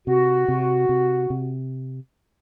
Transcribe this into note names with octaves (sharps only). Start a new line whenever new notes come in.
C3 F#4
C3
C3
C3